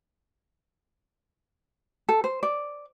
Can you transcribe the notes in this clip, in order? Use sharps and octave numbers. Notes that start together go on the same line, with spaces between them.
A4
C5
D5